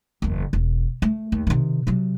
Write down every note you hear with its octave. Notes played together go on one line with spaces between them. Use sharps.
F#1 E2
E1
A3
D#2
C3 D#3
C3 F#3